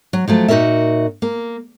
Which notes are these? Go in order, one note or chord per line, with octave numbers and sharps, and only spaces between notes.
F#3
F3 F#3 A3
A#2 D#4 F#4 A4 A#4 E5
A#3